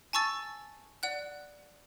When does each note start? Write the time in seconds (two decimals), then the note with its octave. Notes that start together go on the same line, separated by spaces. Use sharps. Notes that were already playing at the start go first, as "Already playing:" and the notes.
0.13 G#5 A5 C#6 E6 A6
1.03 D5 F#5 F#6